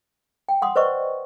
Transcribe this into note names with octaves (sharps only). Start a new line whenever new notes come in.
G5
F#5 C6 D#6
B4 C5 D5 D#5 C#6